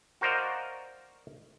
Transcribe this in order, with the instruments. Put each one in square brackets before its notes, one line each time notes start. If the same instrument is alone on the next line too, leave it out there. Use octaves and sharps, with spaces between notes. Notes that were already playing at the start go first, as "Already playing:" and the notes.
[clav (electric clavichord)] F#4 A#4 C5 D5 D#5 F5